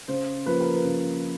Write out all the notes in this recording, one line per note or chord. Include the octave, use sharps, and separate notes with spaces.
C#3 C5
F3 A#3 B4
A#4
B4
C#3